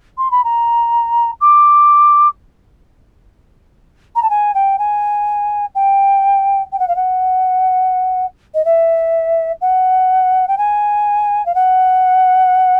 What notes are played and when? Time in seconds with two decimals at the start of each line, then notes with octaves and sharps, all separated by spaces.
0.18 C6
0.31 B5
0.44 A#5
1.41 D6
4.15 A#5
4.22 A5
4.30 G#5
4.54 G5
4.79 G#5
5.75 G5
6.72 G5
6.79 F#5
6.88 F5
6.96 F#5
8.54 D#5
8.65 E5
9.61 F#5
10.48 G5
10.58 G#5
11.46 F5
11.55 F#5